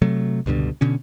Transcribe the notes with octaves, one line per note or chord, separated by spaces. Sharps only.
C3 F#3 A3
C#2 G2 B2 D3
B2 D3 C#4